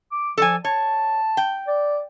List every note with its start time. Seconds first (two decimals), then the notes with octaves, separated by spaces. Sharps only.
0.12 D6
0.38 F3 A4 D5 G#5
0.65 C#5 A5
1.37 G5
1.67 D5